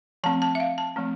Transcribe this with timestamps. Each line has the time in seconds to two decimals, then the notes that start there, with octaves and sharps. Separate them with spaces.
0.24 F3 A3 C4 A5
0.42 A5
0.55 E5
0.60 F5
0.78 A5
0.96 F3 A3 C4